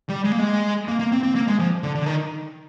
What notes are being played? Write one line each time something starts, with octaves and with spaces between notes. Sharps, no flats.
G3
G#3
A#3
G#3
A#3
A#3
C4
C4
A#3
G#3
F3
D3
D3
D#3